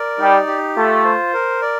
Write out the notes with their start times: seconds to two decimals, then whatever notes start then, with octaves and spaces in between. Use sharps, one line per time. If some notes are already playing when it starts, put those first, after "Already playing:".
Already playing: A#4 D5
0.18 G3 D#4
0.47 G4
0.76 A3 F4
1.05 C5
1.33 A#4
1.62 D5